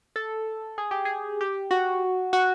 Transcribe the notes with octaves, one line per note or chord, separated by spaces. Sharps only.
A4
G#4
G4
G#4
G4
F#4
F#4